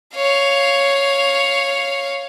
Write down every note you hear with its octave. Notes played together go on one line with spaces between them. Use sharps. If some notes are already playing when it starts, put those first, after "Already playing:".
C#5 F5